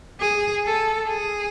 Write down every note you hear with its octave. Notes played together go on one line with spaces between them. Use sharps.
G#4
A4
G#4